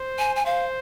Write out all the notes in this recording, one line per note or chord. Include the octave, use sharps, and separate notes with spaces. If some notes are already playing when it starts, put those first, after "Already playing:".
Already playing: C5
G#5
G#5
C5 F5